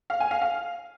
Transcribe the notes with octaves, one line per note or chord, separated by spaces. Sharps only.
F5
G#5
F5
F5